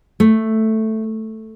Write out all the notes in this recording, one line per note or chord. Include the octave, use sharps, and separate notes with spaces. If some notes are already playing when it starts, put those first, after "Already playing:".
A3